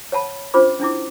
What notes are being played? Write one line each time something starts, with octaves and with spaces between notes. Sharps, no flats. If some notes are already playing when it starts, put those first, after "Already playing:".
C#5 F#5 A5 B5
C#4 D4 F4 C5 B5 D6
C#4 D4 E4 D6